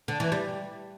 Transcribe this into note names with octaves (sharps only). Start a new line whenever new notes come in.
D3
E3
G3